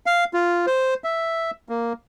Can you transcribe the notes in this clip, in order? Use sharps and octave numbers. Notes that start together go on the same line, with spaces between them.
F5
F4
C5
E5
A#3